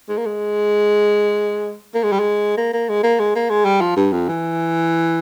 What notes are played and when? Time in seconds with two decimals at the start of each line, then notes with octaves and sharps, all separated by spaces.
0.09 G#3
0.18 A#3
0.26 G#3
1.95 A#3
2.04 G#3
2.12 G3
2.20 G#3
2.57 A#3
2.73 A#3
2.89 G#3
3.03 A#3
3.19 G#3
3.35 A#3
3.50 G#3
3.65 G3
3.81 F3
3.97 G2
4.12 F2
4.28 E3